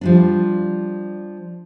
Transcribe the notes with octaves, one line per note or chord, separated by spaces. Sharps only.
F3 G3 D4